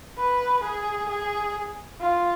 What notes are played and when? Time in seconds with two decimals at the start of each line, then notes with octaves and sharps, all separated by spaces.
0.18 B4
0.64 G#4
1.09 G#4
2.01 F4